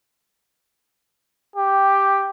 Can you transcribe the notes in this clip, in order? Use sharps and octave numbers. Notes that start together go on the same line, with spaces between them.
G4